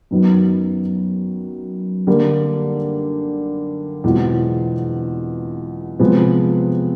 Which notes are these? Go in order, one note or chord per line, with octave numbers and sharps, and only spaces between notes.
F#2 D#3 F#3 B3
D3 G3 A#3
E2 B2 G#3 C4 F4
C3 F3 G#3 B3